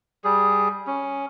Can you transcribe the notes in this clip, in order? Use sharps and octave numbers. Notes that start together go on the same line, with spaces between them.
G3 G#4
C#4